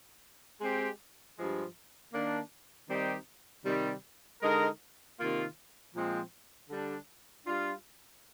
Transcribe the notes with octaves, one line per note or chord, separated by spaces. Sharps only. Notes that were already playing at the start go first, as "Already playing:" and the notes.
G#3 C4 G4
G2 F3 G#3
D#3 A#3 D4
D#3 G3 C4 D#4 G4
C3 D#3 G3
D3 G#3 D#4 A#4
C3 D#3 A#3 F4
A#2 F3 G#3 C4
D3 G3 D4
G3 D4 F4